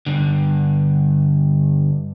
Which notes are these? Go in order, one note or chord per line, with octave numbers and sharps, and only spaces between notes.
G2 D3